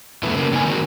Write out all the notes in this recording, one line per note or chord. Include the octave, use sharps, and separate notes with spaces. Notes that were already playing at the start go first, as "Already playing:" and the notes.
F2 B2 A3 B3 E4
C#3 A#3
A2 B3 D4 D#4 A4 G#5
D#3 C4 D#4 F#4